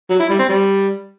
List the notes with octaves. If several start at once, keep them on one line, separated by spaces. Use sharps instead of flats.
F#3
E4
G3
C4
G3